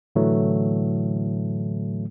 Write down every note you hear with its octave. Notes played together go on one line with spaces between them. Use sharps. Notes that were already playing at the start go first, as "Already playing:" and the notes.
A2 D3 E3 F#3 A3